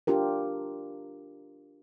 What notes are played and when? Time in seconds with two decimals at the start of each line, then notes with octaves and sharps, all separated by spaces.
0.07 D4 F4 G4 A#4